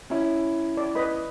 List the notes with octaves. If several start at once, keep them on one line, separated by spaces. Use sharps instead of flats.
C#4 E4
D5
B4 D#5 B5